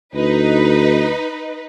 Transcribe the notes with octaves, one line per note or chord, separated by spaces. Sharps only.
D2 D#4 B4